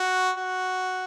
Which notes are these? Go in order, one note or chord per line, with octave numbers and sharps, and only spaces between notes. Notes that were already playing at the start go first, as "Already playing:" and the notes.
Already playing: F#4
F#4